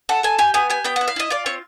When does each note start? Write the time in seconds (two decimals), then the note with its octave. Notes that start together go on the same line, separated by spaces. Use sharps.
0.09 A4 F#5
0.23 A4 G#5
0.39 G4 G#5
0.54 B3 G#5
0.70 G4 G#5
0.84 B3 G5
0.96 F#5
1.01 E4
1.08 F5
1.16 E4 D#5
1.30 F4 D5
1.46 C4 C#5